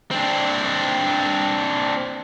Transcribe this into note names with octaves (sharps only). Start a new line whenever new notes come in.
C4 D4